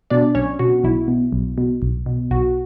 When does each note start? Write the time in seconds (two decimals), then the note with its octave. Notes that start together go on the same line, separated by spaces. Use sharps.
0.10 B2 D4 D5
0.35 B1 C#4 C#5
0.59 B2 F#4
0.84 B1 E4
1.08 B2
1.33 B1
1.58 B2
1.82 B1
2.06 B2
2.31 B1 F#4